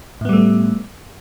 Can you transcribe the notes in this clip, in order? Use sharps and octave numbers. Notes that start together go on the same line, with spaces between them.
A2 G3 A3 B3